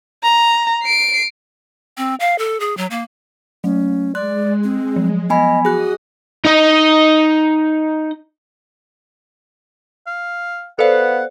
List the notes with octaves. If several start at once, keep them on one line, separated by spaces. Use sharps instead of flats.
A#5
C7 D7
C4
F5
A4
G#4
F#3
A#3
F#3 A3 C#4
G#3 D5 C6 F#6
C4
F3 F#3
B3 D#5 G#5 B5
F#4 G#4 D#5 D#6 F#6
D#4 D#5
F5
B3 A4 C5 D5 F5 F#5